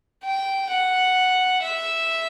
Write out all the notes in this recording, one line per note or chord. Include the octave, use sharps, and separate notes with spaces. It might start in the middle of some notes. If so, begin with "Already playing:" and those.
G5
F#5
E5